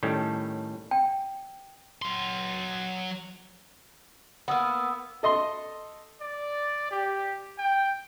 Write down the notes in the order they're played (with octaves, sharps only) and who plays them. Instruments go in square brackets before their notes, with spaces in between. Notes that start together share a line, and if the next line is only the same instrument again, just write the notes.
[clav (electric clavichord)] A2 D#3 G3 C#4 A4
[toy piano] G5
[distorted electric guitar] F#3 C6
[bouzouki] A#3 B3 [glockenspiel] B5 D#6 E6
[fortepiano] A4 D#5 C6
[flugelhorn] D5
G4
G5